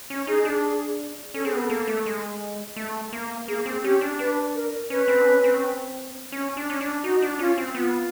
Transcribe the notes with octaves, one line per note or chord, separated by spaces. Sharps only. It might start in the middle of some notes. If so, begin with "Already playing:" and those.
C#4
D#4 G#4
D4
G#4
C#4 A4
C4 G#4
B3 B4
A4
A#3
A3
G#3
A3
A#3
A#3 G#4
C4
C#4 G4
D4
D4 B4
A#4
C#4 B4
C4
D4
C#4
C4
C#4
C4
C#4
D4
C#4
D4
D#4 F#4
D4
C#4 F4
C4
B3 F4